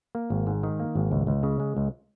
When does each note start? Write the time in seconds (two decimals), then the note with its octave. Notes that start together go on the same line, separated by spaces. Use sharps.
0.15 A#3
0.30 G#1
0.47 G#2
0.63 D#3
0.80 A#3
0.95 G#1
1.11 C#2
1.27 C#2
1.43 C#3
1.60 G#3
1.77 C#2